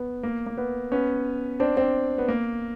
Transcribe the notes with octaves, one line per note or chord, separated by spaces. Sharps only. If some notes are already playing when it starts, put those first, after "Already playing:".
Already playing: B3
A#3
A#3
B3
B3 C#4
C4 D4
C4 D4
B3
A#3